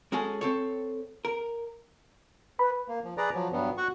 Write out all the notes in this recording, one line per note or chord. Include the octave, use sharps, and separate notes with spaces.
G#3 C#4 F#4 G#4 A4
C4 A4 C#5
A#4
B4 B5
A#3
F3
G#4 B4 D5 A#5
F3 F#3
G2 F#3 G3 B3
F#4 F#5 C#6